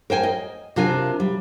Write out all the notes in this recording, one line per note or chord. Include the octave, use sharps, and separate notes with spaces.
A#4 C5 G5 G#5
D#5
C3 D4 F4 A#4 G#5
G3